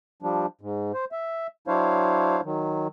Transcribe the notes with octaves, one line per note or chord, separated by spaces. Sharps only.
F3 G3 D4
G#2
C5
E5
F#3 D4 E4 C5 C#5 F5
D#3 F#3